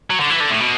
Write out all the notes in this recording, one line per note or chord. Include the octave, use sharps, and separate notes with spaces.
F#3
D3
E3
D3
A2
B2